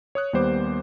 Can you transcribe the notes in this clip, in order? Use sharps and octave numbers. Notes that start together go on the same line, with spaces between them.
C#5 D#6 F#6
D#2 G3 B3 C5 D6